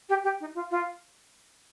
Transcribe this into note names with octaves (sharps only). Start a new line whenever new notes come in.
G4
G4
D#4
F4
F4